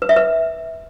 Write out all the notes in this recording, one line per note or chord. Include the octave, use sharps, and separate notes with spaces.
B4
E5
B4